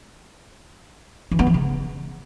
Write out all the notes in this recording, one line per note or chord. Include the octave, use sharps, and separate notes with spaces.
E3
B3
F3
C#3